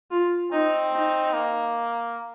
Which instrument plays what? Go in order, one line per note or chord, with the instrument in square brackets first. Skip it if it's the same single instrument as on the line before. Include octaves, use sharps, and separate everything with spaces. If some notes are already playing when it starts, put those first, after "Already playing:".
[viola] F4
[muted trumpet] C4 [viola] D#4
[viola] D#4
[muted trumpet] A#3